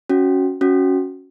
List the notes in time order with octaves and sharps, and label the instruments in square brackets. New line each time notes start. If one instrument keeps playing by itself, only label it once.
[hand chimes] C#4 F#4
C#4 F#4